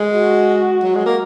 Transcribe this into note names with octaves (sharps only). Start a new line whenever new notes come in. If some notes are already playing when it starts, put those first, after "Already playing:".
Already playing: G#3
F#4
F#3
G#3
A#3